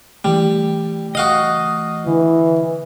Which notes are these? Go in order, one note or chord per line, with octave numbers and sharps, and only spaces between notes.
E3 G3 A3
F#4 D#5 F5 D#6
D3 E3